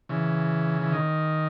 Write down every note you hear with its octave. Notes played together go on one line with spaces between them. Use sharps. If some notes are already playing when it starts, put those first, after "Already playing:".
C#3 E3
E3
D#3